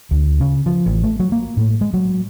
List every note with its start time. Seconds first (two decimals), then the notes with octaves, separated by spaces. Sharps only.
0.11 D2
0.41 C#3
0.66 F3
0.86 A1
1.03 A3
1.19 F#3
1.32 A#3
1.57 A2
1.81 G#3
1.94 F#3